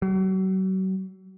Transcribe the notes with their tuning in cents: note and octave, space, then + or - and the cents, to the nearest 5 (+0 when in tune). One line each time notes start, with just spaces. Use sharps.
F#3 +35